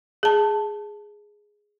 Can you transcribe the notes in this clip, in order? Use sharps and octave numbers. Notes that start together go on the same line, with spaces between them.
G#4 A5